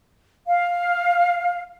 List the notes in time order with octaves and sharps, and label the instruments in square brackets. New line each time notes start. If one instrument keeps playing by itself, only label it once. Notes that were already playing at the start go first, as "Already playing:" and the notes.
[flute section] F5